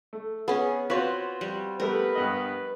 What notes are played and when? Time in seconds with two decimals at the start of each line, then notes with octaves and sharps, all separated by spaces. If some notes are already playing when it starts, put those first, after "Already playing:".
0.13 A3
0.48 B3 C#4 G#4
0.90 C4 F4 F#4 B4 C#5
1.41 G3
1.80 G3 A3 B3 A#4 B4
2.15 G2 B3 D#5